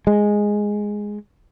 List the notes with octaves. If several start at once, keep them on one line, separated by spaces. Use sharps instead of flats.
G#3